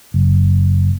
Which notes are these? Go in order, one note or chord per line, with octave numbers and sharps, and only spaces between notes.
F#1